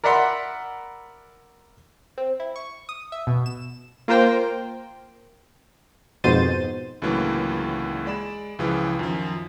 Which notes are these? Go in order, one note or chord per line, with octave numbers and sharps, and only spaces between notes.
A#4 D5 E5 F#5 B5 C6
C4
E4
C#6
D#6
E5
B2
E7
A#3 F4 A#4 C5 G5
F2 G#2 B2 C5 A6 D#7
C#2 A2 D3 E3 F#3 A#3
G#3 D5 B5 E7
C#2 C#3 E3 F3
F#2 D#3 F3